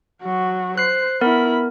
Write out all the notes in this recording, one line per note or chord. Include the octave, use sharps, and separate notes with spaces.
F#3 F#4
C5 F#6 C7
B3 E4 A#4 B5